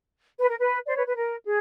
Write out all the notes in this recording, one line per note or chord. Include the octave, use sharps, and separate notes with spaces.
B4
A#4
B4
C5 D5
B4 C#5
B4
A#4
G#4